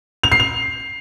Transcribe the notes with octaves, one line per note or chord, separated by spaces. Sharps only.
F7
C7
F7